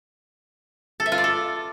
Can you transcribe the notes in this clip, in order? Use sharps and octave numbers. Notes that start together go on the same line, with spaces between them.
A4
E5
F4
D5
A4